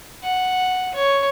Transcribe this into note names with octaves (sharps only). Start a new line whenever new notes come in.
F#5
C#5